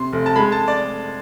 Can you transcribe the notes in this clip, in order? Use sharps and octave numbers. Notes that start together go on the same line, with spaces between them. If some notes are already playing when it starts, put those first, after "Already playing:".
Already playing: C3 C6
F1
A5
G#3 B5
A5
D5